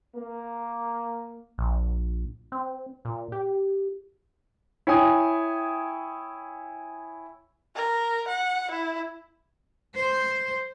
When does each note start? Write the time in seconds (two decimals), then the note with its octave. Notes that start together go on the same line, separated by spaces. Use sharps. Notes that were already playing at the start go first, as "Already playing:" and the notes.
0.15 A#3
1.58 A#1
2.52 C4
3.05 A#2
3.32 G4
4.87 E4 C#5 G5 G#5 D#6
7.76 A#4
8.28 F#5
8.71 E4
9.95 C5